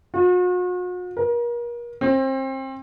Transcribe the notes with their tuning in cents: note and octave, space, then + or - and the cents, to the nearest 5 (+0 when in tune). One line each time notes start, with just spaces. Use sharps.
F#4 -45
A#4 +35
C4 +30